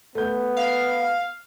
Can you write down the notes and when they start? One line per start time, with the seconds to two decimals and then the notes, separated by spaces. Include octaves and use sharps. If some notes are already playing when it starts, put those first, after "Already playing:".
0.15 A3 B3 G6
0.57 F5